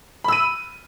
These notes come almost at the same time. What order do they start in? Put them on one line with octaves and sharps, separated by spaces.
B5 E6 D#7